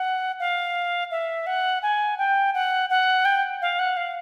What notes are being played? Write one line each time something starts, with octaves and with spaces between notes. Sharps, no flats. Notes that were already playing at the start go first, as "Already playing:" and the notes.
Already playing: F#5
F5
E5
F#5
G#5
G5
F#5
F#5
G5
F5
F#5
F5